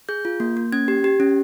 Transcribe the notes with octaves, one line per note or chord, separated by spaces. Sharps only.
G#4 G6
F4
A#3
A#3
C#4 G#6
G4
G4
C#4